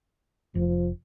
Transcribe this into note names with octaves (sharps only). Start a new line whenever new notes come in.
F1 F3